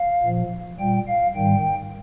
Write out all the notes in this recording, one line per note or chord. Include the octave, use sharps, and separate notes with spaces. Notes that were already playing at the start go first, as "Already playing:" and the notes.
Already playing: F5
A#2 F3
A#2 G3 G5
F5
G#2 D#3 G3 G5